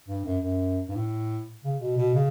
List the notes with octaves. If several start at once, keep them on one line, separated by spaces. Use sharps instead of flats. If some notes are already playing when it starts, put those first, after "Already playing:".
G2
F#2
F#2
G2
A2
C#3
B2
B2
C#3